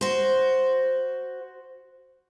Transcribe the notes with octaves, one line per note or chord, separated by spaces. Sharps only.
F#4 C5